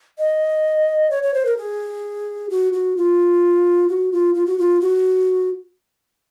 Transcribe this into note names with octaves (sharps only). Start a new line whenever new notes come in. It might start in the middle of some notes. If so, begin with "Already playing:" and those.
D#5
C#5
C#5
C5
A#4
G#4
F#4
F#4
F4
F#4
F4
F4
F#4
F4
F#4